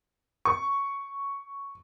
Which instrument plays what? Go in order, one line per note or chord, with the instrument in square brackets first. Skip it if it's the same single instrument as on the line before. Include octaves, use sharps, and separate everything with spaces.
[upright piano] C#6